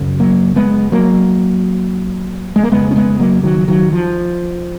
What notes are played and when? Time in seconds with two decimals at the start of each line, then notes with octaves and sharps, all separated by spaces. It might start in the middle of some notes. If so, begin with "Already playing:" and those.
Already playing: F#2 C#3
0.20 F#3 A#3
0.56 G#3 B3
0.92 F#3 A#3
2.56 G#3
2.63 A#3
2.71 F2 C#3 G#3 B3
2.91 C#4
2.96 G#3 B3
3.19 F#3 A#3
3.43 D#3 F#3
3.68 D#3 F#3
3.92 F3